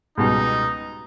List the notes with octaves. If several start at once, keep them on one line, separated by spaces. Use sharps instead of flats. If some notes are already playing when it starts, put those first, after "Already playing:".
C#2 B2 G3 D#4